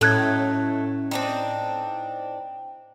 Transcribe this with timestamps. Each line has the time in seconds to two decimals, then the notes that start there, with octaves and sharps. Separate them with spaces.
0.01 A2 F#3 A3 C#4 D#4 A4 F#6 G#6
1.11 C4 D4 D#4 G5